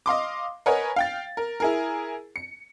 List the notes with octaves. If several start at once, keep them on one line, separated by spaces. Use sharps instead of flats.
D#5 F5 C6 D6
A#4 B4 C#5 D#5 F#5 G#5
F5 G5 A6
A#4
E4 G#4 A#4
C#7